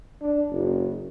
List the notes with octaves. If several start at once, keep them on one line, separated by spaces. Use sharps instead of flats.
D4
F#1